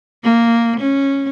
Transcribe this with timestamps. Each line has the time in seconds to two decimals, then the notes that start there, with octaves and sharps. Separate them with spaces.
0.24 A#3
0.80 C#4